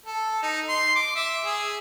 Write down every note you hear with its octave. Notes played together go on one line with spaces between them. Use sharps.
A4
D#4
C6
D6
E5
G#4